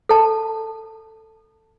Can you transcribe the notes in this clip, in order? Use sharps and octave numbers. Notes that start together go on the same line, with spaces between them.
A4 A5